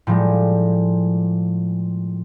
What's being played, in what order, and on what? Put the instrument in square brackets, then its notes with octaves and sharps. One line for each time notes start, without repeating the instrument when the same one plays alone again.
[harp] A2 F3 G3 G#3